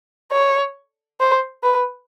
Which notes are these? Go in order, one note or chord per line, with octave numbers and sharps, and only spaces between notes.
C#5
C5
B4